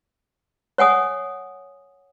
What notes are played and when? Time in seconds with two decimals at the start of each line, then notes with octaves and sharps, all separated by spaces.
0.78 C#5 F#5 G#5 D#6